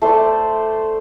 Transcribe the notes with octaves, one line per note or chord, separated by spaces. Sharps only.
A3 C5 D5